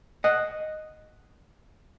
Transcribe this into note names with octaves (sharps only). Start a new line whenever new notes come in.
D#5 F#5